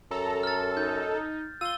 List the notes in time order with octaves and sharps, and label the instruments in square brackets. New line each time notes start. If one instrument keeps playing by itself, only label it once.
[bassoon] F#2 [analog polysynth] A4 [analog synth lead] A#5
[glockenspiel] F6 A6
[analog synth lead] D#4 [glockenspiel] G6
[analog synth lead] F4 [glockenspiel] E6 G7 [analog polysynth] D#7